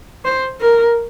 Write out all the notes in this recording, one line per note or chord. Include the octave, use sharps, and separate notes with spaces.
C5
A#4